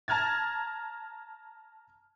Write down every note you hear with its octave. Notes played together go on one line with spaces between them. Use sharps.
A5 A#5 F6 G#6 A6